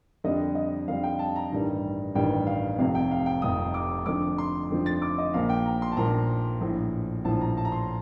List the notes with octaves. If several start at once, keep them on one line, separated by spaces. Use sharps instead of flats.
F2 D3 G3 D#5
D#5
F2 D3 G3 F5
G5
A5
A#5
A1 G2 D#3 G3
A1 G2 D#3 G3 G5
F5
F1 F2 C3 F5
G5
F5
G5
F1 F2 C3 D#6
D6
F2 D3 F3 D6
C6
F2 D3 F3
A6
D6
D#5
A#1 A#2 F3 F5
G5
A#5
C6
A5
A#1 A#2 F3 A#5
A#1 A2 F3
A#1 A2 F3 A5
A#5
A5
A#5
C6